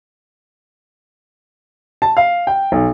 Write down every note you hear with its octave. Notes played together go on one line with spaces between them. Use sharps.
A5
F5
G5
B1